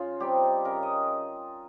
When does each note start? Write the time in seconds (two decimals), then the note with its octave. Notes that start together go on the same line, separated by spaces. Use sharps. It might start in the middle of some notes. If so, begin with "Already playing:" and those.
Already playing: C#3 F4
0.20 G3 C4 D#4 G4
0.65 C#3 A#4
0.83 D#5